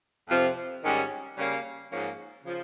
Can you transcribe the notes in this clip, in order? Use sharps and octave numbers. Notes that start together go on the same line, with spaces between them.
F2 C3 F3 C4 F4
G#2 D#3 G3 C#4
C#3 G3 A#3 C#4
G#2 F3 A#3 C#4
C#3 F3